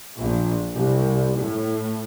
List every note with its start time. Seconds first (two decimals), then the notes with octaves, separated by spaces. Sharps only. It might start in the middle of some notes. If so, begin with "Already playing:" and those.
0.18 A#1
0.73 C2
1.38 A2